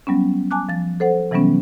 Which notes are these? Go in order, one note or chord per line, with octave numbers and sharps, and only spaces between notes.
F#3 G3 B3 C#4
G#5 A5 D6 F#6
F3 A6
A4 C5 F#5
C3 E3 F#3 G3 B3 C#4